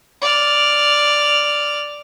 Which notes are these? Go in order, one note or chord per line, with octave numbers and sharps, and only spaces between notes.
D5 F6